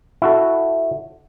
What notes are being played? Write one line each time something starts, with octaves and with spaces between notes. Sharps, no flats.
E4 F#4 A4